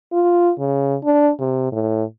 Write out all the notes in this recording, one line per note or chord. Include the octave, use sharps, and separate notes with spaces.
F4
C#3
D4
C3
A2